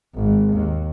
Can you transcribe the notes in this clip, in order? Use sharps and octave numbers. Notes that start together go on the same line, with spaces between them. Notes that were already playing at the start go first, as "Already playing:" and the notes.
G#1
D#2